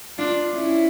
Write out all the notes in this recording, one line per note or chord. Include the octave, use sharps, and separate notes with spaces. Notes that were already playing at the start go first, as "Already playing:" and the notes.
D4 F4
C#4 E4